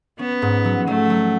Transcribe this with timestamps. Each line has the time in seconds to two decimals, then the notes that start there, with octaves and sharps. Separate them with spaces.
0.19 B3 C#4
0.42 G#2
0.65 F#3
0.87 F#3 A3
1.10 F#3